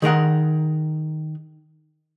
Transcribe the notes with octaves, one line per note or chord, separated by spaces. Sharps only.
D#3 G#4 A#4 F#5